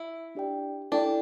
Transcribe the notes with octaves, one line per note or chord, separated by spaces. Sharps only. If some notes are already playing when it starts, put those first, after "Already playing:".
Already playing: E4
D4 G4 D5 G5
D4 E4 A4 D5 G5